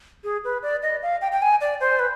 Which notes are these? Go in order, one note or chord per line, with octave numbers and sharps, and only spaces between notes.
G#4
B4
D5
D#5
F5
G5
G5
G#5
D5
C5
B4